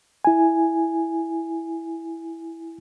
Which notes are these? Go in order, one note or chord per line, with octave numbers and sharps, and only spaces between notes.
E4 G#5